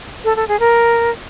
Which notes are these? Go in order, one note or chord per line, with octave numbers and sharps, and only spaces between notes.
A4
A4
G#4
A#4